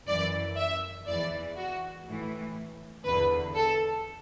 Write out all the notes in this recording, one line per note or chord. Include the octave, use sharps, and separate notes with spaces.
F#2 E3 D5
E5
E2 E3 D5
F#4
A2 E3
E2 D3 B4
A4